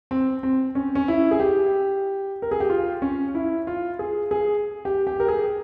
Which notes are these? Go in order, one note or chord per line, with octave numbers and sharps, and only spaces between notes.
C4
C4
C#4
C#4
E4
G#4
G4
A#4
G#4
G4
F4
C#4
E4
F4
G#4
G#4
G4
G4
A#4
G#4